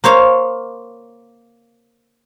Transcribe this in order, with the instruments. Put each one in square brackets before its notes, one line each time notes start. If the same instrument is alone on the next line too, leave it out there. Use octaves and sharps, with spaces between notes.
[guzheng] A#3 C5 C#5 F5